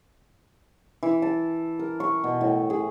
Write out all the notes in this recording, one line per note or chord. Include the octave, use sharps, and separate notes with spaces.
E3
A5
A#4
C#6
B2
A2
G#4